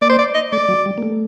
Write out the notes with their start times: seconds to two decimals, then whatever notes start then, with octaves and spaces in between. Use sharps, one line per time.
0.02 A#3 D5
0.09 C5
0.18 D5
0.34 D#5
0.52 A3 D5
0.69 F#3
0.86 G3
0.98 A#3
1.03 A3